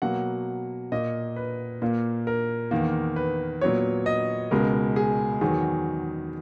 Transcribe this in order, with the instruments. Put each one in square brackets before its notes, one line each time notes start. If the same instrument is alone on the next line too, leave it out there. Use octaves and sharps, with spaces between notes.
[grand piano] B2 F#3 A#3 F#5
A#2 A#3 D#5
B4
A#2 A#3
A#4
E2 D#3 A#3
B4
A#2 F#3 B3 C#5
D#5
C#2 B2 G#3 A#4
G#4
E2 D#3 F#3 G#4